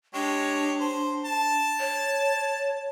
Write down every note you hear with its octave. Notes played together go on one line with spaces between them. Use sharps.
G#3 D4 G4 C#5
C5
A5
C#5